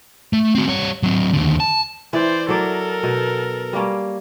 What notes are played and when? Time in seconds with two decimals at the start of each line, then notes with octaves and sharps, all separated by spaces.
0.33 A3
0.55 C4 F#4
0.67 G3 C#5
1.03 F#3 C4
1.33 D#2 D3
1.60 A5
2.13 E3 C5 D5
2.48 F#3 A4 A#4 D5
3.03 B2
3.73 G3 A#3 C#4